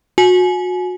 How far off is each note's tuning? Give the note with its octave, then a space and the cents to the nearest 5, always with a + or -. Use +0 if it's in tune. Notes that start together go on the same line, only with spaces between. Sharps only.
F#4 -30 G#5 +30